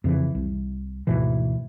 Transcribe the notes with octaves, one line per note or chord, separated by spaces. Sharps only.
F2 C#3 E3
C2
D2 G#2 B2 E3